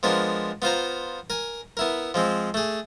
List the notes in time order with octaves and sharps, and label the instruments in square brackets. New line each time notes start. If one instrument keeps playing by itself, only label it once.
[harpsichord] F3 G#3 B3 D4 A#4
B3 F4 C5 A#5
A#4 G#5
B3 E4 A#4
F3 G#3 C4
A3 G#4